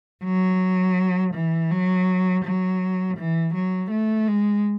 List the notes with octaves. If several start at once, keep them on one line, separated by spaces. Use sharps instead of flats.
F#3
E3
F#3
F#3
E3
F#3
A3
G#3